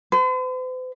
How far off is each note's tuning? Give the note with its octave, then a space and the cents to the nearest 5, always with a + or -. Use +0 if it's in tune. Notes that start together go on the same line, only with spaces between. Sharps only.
C5 -45